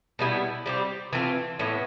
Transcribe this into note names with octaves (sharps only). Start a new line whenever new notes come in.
B2 G3 B3 E4
G3 C4 G4
E3 A3 C4 F4
A2 E3 B3